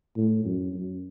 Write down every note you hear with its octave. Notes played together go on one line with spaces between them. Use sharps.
A2
F#2
F#2